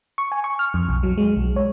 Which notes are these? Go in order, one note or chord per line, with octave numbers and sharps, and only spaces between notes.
C#6
G#5
C#6
F6
F2
B1
F#3
G#3
B1
C#5